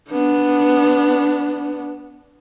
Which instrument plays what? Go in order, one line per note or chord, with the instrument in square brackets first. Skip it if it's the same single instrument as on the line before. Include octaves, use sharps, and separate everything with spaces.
[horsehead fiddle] B3 D4